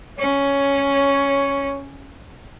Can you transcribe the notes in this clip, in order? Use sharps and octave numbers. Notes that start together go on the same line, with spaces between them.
C#4 C#5